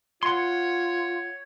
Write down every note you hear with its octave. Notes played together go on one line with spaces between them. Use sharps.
F4 C#5 F#5 C6